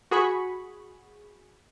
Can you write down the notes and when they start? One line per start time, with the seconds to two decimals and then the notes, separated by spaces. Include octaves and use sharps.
0.11 F#4 G#4 B5 C#6